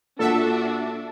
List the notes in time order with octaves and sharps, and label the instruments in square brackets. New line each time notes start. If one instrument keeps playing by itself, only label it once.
[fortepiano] A#2 F#5 [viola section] D4 F#4 [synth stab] A4 E5